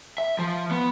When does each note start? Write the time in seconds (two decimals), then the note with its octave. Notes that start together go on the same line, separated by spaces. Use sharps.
0.18 E5
0.39 F3
0.71 B3